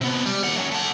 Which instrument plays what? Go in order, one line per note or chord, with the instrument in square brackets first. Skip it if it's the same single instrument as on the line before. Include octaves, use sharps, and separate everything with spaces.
[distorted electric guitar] C3 B3
G3
D#2 F#5
F#3 C#4
A3 F#5